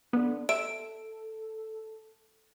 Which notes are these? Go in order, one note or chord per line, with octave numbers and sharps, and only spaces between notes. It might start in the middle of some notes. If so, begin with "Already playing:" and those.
D3 B3
A4 E5 D7